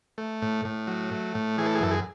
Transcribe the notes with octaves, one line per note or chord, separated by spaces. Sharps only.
A3
A2
A2
F#3
A3
A2
E3 G#4
A4
G#4
F#2 A4
G#4